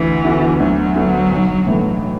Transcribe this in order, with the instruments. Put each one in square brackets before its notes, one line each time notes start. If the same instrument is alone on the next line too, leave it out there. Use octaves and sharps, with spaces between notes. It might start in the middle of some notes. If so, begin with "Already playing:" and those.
Already playing: [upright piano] D2 [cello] E3
[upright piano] D3 B3 F#4
[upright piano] D2 [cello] F#3
[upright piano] D3 B3 F#4
B1
A2 E3 A3